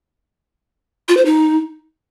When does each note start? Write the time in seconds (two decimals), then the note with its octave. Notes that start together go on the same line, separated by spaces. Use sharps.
1.08 F4
1.17 C5
1.25 D#4